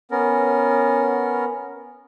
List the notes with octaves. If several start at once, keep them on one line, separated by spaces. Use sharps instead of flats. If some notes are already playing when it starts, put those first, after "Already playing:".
B3 C#4 A#4